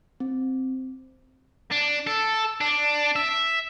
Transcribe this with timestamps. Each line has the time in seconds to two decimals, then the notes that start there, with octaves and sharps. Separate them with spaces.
0.20 C4
1.72 D4
2.07 A4
2.61 D4
3.16 E5